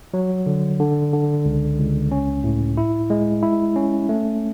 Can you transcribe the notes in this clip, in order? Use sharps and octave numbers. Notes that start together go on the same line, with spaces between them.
F#3
D3
D3
D3
C#2
C#2
C#4
A2
E4
G#3
E4
C#4
A3